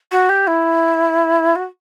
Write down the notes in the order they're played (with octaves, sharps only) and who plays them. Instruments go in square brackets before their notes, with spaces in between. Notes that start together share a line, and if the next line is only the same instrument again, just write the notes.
[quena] F#4
G4
E4
F#4